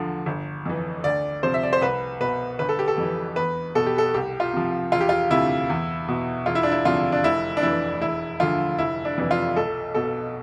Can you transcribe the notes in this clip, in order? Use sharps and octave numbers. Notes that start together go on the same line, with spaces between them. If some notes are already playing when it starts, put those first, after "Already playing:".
Already playing: E2 D3 F3
G1
F2 E3
D2 D5
C3 F3 C5
E5
D5
C5
C2 B4
B2 B4
G1 B4
A4
G4
A4
F2 E3
E2 B4
B2 A4
G4
A4
C2 G4
F4
C3 F3
E1 F4
G4
F4
D2 C3 E4
E2
B2
E1 F4
E4
D4
E4
D2 C3 F3 F4
D4
F1 E4
D4
F2 E3 E4
E1 E4
D2 D3 F3 F4
F1 E4
D4
F2 C3 E3
F4
B1 A4
B2 A4